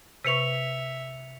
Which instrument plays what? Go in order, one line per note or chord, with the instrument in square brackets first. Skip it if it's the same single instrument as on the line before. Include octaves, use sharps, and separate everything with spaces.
[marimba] C3 B4 C#6 [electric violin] E5 [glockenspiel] B6 C#7 F7